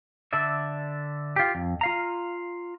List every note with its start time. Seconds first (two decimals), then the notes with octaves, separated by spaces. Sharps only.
0.33 D3 A4 D5 E5
1.36 F4 G4
1.55 F2
1.81 F4 F5 A#5